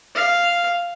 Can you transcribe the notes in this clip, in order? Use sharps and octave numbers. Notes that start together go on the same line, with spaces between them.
F5